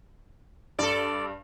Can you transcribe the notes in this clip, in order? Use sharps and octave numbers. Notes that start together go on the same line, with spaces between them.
G2 A4 D5